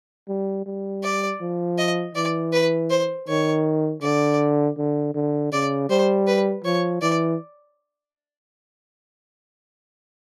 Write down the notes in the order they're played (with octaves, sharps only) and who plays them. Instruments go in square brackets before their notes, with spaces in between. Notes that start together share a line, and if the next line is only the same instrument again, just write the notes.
[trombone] G3
G3
[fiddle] D5
[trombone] F3
[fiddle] D#5
[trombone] E3 [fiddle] D5
[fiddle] B4
C5
[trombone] D#3 [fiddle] C#5
[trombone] D3 [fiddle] D5
[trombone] D3
D3
[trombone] C#3 [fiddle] D5
[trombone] G3 [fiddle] C5
[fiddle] B4
[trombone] F3 [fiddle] C#5
[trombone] E3 [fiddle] D5